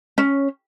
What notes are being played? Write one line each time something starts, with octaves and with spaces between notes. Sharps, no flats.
C#4